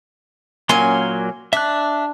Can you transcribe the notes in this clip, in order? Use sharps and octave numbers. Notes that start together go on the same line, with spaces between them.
A#2 F#3 A#3 C#4 G#5 C6
D4 E5 F#6